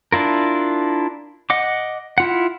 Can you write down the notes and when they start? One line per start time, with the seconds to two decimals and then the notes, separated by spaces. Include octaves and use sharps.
0.12 D4 E4 F4 A#4
1.50 D#5 F#5 D6
2.18 E4 F4 F#5